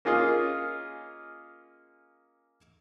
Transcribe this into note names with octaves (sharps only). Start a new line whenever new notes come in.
A#3 C#4 F4 G#4 D#5